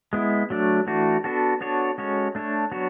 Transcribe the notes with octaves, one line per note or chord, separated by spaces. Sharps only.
G#3 B3 E4
F#3 A3 D4
E3 A3 D4 F#4
B3 D4 F#4 A4
B3 D4 F#4 A4 C#5
G#3 C#4 F#4 A4 C#5
A3 D4 A4 C#5
F#3 B3 D4 F#4 C#5